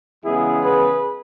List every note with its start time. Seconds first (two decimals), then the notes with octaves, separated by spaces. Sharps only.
0.23 E2 C#3 G#3 B3 E4 G#4
0.64 G#4 B4